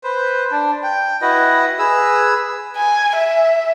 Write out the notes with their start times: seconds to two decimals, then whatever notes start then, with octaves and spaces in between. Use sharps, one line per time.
0.04 B4 C5
0.51 D4
0.83 G5
1.21 E4 F#4 B4 D#5
1.79 G#4 B4 E6
2.76 G#5
3.16 E5